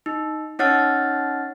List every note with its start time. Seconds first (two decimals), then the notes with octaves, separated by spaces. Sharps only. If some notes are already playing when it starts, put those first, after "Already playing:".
0.06 D#4
0.59 C#4 D#4 C#5 F#5 F6 A6